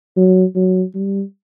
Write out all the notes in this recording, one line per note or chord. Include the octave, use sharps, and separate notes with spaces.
F#3
F#3
G3